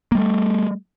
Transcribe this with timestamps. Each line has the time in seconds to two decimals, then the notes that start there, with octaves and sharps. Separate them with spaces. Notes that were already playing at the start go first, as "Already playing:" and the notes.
0.12 A#3
0.15 G3
0.18 A3